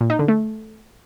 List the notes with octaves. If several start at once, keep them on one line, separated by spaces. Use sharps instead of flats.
A#2
D#4
D3
A3